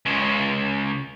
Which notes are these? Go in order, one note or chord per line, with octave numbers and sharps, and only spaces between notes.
C#2 C#3